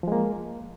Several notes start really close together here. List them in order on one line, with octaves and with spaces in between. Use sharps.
F3 G#3 A#3